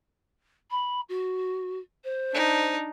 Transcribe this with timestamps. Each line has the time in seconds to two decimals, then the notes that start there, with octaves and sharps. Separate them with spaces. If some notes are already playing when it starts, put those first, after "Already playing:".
0.71 B5
1.09 F#4
2.04 C5
2.33 D4 D#4